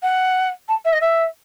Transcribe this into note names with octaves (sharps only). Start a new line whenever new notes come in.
F#5
A5
E5
D#5
E5